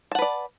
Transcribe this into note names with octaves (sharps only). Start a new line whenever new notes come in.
B4 D5 F#5 A5